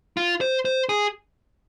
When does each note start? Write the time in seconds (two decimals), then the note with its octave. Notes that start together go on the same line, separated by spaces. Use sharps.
0.17 F4
0.41 C5
0.65 C5
0.89 G#4